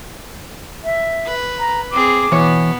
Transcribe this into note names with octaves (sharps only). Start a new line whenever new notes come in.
E5
B4
A#5
C4 G#4 D6
B2 E3 B3 C#5